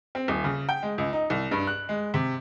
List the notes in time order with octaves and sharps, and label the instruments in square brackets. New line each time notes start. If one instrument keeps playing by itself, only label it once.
[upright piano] C4
D#1
C#3
G5
G#3
C#2
D#4
C2
G2
F#6
G#3
C3